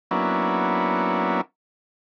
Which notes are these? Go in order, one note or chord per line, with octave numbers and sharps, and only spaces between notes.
F#3 A#3 B3 C#4 D4 E4